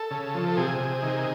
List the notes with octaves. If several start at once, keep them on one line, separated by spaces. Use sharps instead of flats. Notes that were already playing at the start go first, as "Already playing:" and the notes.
Already playing: A4
C#3
F3
A4
C3 G#4
C3
D#3